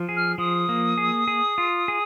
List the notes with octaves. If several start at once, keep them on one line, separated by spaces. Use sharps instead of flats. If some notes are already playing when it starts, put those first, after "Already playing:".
Already playing: F3
G#4
F6
F3 D#6
A#3
G#4
G#4
F4
G#4